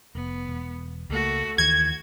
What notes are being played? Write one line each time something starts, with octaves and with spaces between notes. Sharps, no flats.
F1 B3
E1
C#2 A3 A#3 F#4
D#2 D#3 E3 F#4 G#6